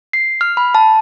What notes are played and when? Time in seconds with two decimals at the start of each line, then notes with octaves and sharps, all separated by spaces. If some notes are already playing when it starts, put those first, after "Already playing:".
0.13 C7
0.41 F6
0.57 B5
0.75 A5